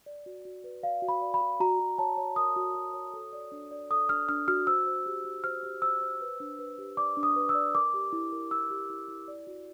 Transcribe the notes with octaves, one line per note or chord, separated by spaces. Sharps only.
D5
F#4
F#4
B4
D5 F5
F#4
B5
D5
B5
F#4
F#4 A#5
F#4
C#5 A5
C#5
A#4 D#6
F#4
F#4
C#5
A4
D5
D4
D5
A4 D#6
D4 F6
D4 F6
F#4 F6
C5 E6
C5
G4
G4
C5 F6
G4
C5 E6
C5
B4
D4
B4
G4
D5 D6
D4
D#6
B4
E6
D5
A#4 D6
G4
E4
A#4
E4 E6
G4
E4
E4
D5
F#4